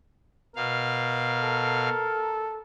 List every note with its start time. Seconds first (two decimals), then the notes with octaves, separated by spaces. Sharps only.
0.56 B2 A#4 F5
1.40 A4